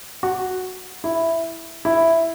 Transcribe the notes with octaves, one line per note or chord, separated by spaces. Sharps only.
F#4
E4
E4